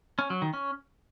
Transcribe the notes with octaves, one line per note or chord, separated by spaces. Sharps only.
C#4
F#3
D#3
C#4